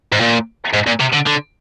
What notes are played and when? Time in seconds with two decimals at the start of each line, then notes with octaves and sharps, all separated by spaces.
0.13 G#2
0.21 A#2
0.73 G#2
0.87 A#2
1.00 C3
1.13 D3
1.26 D3